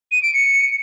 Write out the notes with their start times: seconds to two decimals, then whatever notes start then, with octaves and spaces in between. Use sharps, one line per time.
0.12 D#7
0.23 D7
0.34 C#7